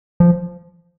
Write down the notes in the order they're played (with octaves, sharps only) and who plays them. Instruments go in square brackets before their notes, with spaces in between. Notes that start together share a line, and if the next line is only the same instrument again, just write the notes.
[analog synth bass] F3